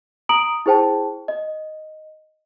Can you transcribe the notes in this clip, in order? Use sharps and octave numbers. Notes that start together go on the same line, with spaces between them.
A#5 D#6 D7 F#7
E4 G#4 C5 G5 A5
D#5